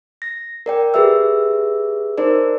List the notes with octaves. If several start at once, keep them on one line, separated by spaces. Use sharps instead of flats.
A#6
A#4 D5 G5
G4 G#4 B4 E5 E6
D#4 A#4 C5 D5